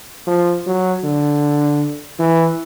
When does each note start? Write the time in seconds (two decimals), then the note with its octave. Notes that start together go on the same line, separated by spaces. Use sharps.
0.27 F3
0.66 F#3
1.04 D3
2.19 E3